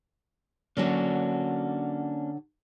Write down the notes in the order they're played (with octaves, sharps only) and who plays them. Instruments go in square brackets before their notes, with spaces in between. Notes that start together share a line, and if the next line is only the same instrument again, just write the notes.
[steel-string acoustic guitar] D3 F#3 F#4 [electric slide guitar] A#3 C#4 D4